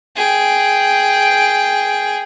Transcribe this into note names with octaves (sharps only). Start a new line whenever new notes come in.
G#4 G5